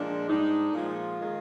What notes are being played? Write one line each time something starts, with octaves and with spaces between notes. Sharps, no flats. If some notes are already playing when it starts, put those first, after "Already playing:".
Already playing: A#2 F3 G#3 D4
G#2 G3 D4 D#4
A#2 F3 G#3 F4
D#3 G#3